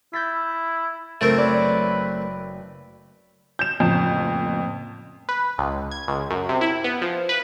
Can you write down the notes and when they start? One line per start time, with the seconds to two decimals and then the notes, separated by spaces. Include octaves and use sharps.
0.13 E4 G6 A6 B6
1.21 F#1 A3 C4 A#4
1.38 B4 C#5 D5
3.59 G6 E7
3.80 F2 A2 C#3 A#3
5.29 B4
5.58 C#2
5.91 G#6
6.08 C#2
6.30 F#2
6.49 C3
6.61 E4
6.84 B3
7.02 F3
7.29 B4